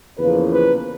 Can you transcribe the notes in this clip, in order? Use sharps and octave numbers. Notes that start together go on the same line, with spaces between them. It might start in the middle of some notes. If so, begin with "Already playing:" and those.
E2 C#3 F3 A#3 B4
B4